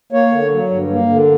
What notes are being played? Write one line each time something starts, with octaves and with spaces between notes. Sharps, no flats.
A#3 C#5
D3
F#3
G2
A#3
D3